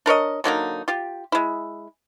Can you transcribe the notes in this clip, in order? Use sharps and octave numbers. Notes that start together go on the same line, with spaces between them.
D4 A#4 C#5 D#5
D3 F#3 A#3 D#4
F4 G4
G#3 E4